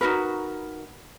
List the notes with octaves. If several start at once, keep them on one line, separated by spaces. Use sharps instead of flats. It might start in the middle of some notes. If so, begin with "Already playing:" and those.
D#4 F#4 A#4 B4